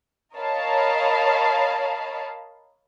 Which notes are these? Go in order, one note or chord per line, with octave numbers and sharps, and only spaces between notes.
A#4 C#5 D#5 F5 A5 B5